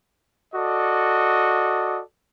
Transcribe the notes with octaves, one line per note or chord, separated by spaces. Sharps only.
F#4 A4 D5 D#5